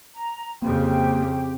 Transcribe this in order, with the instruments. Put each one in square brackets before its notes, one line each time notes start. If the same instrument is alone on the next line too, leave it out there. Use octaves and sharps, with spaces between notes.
[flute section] A#5
[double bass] F2 C#3 [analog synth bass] A#3 [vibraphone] C4 [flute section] G4 C5 G5